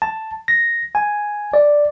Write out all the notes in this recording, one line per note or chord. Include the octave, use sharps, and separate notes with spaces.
A5
A#6
G#5
D5